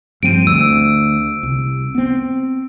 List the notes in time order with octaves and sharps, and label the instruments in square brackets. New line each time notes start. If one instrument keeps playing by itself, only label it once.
[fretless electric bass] G2 F3 C4 [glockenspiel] D7 D#7
[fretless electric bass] D2 [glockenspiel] E6
[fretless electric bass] C2
B3 C4